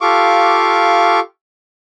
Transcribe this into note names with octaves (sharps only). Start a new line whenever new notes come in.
F4 G4 A4 F5 C#6 D6